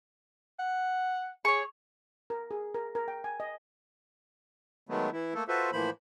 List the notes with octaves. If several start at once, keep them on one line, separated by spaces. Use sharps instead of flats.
F#5
G#4 C#5 C#6
A#4
G#4
A#4
A#4
G5
G#5
D#5
D#3 F#3 G#3 A3 B3
E3 E4
A3 A#3 A4
F4 F#4 A4 B4 C5 E5
A2 E3 F3 A#3 C5 B5